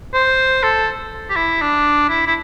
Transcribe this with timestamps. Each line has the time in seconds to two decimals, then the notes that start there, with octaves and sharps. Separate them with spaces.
0.14 C5
0.63 A4
1.30 G4
1.36 E4
1.61 D4
2.09 E4
2.27 E4